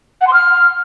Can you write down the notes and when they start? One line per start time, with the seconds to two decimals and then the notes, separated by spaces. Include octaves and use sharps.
0.21 F#5
0.27 C6
0.33 F6